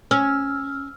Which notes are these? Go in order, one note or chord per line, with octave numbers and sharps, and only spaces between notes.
C#4 E6 F6